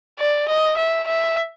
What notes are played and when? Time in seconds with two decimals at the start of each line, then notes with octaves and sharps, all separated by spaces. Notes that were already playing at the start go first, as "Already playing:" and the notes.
0.19 D5
0.49 D#5
0.77 E5
1.07 E5